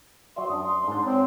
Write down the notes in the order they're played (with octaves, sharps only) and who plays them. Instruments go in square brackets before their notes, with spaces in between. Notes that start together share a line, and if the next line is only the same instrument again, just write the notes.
[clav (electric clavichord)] F#3 D5 E5 [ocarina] C6
[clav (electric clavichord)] F#2 D4 [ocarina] D#6
[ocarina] C6
[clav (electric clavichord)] G#2 D4
[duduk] C4 [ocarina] C#5